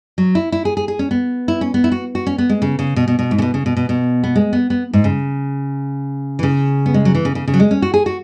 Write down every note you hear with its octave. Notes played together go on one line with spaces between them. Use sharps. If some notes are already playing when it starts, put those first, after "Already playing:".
F#3
E4
E4
G#4
G#4
G#4
C#4
B3
E4
C#4
B3
E4
F#4
F#4
C#4
B3
G#3
C#3
C#3
B2
B2
B2
G#2
C#3
B2
C#3
B2
B2
B2
B3
G#3
B3
B3
G#2
C#3
E3
C#3
B3
G#3
F#3
E3
C#3
C#3
C#3
F#3
G#3
C#4
F#4
G#4
F#4